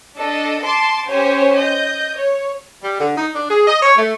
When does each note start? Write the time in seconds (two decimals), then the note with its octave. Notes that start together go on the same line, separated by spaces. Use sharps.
0.15 D4 A4 D#5
0.64 A5 C6 D6
1.09 C#4 G4 C5 C#5 G#5
1.58 D#5 G6
2.16 C#5
2.83 G3
3.00 D3
3.17 D#4
3.35 D4
3.50 G#4
3.67 D#5
3.82 C#5
3.97 A3